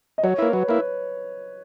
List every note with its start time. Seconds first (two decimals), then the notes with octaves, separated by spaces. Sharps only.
0.18 D#5
0.23 F#3 C#5
0.38 A#3 E4 B4
0.53 F#3 B4
0.68 A#3 E4 B4